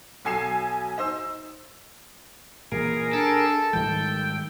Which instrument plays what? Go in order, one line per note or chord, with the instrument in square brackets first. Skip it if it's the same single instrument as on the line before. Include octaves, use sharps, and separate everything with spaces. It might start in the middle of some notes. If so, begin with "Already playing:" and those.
[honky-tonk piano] B1 A4 G#5 C7 E7
D#4 C5 E6
[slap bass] A#2 E3 A#3 [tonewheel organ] G#4 A#4
[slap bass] D4 [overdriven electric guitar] A4
[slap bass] G#2 D#3 G3 [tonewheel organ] G5